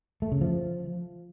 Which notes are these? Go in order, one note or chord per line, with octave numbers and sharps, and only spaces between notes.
A3
C#3
F3